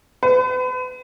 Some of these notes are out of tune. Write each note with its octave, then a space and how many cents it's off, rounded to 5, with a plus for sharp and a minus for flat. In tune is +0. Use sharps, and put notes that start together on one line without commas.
B4 +40